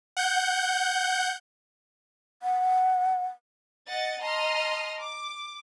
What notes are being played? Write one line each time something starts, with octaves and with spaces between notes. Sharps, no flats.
F#5 G6
F#5
D#5 F#5 A6
D#5 A5 A#5 C6 D#6 F6
D6